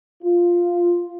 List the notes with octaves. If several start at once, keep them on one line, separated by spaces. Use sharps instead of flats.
F4